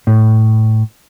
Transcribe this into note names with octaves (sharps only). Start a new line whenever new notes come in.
A2